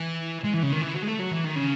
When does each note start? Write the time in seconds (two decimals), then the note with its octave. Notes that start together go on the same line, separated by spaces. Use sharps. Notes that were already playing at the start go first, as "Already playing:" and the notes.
Already playing: E3
0.44 G#3
0.54 E3
0.63 C#3
0.72 D#3
0.81 E3
0.94 F#3
1.02 G#3
1.07 A3
1.19 F#3
1.31 E3
1.44 D#3
1.56 C#3